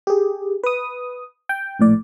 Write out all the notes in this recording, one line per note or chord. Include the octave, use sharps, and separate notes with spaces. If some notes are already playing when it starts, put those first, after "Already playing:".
G4 G#4
B4 D#6
G5
A#1 A2 D5